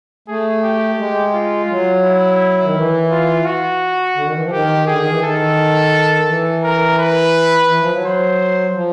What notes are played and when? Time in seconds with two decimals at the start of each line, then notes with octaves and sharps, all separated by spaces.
0.28 A3 G#4
0.63 G4
0.99 G#3
1.34 F4
1.70 F#3
2.04 E4
2.63 D#3
2.76 E3
3.11 F4
3.46 F#4
4.16 D3
4.25 D#3
4.34 E3
4.43 F3
4.51 D#3 G4
4.87 D3 G#4
4.98 D#3
5.10 E3
5.22 D#3 A4
6.28 E3
6.63 A#4
6.99 B4
7.69 E3
7.81 F3
7.93 F#3
8.05 C5
8.75 F3